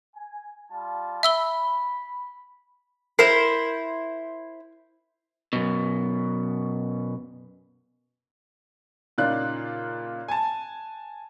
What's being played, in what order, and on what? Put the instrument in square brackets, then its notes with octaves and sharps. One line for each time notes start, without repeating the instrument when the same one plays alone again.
[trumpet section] G#5
G3 F4 A5
[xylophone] E5 E6 G7 [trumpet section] B5
[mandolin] E4 C5 [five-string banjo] A#4 [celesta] C7
[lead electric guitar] F#2 B2
[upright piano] A#2 C#3 D#4 F4 D5 F#6
G#5 A5